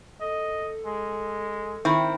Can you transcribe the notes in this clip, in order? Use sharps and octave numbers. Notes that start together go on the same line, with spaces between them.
A4 D#5
G#3
D#3 C4 E4